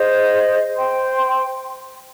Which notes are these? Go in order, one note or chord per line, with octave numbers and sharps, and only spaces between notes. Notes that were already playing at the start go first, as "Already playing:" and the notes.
Already playing: G#4 C5 D#5
C5 G5 C6